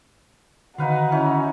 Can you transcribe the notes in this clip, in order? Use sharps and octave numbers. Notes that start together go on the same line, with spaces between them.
D3 D#3 D#4 F#4 B4 F5
C#4 D#4 E4